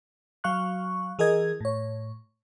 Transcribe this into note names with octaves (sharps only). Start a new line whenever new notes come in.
F#3 F5 C#6 F#6
E3 G#4 A#4 D#5 G#6
A2 C#5